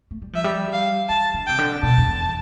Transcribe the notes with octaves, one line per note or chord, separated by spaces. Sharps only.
A3
G3
F3 E5
G3
F5
E3 A5
D3
C3 G5
D3
B2 A5
F2
E2